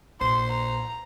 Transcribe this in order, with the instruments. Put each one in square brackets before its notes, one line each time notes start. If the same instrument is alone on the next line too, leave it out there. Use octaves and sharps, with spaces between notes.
[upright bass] A#1 [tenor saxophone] C5 [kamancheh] C6
[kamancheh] A#5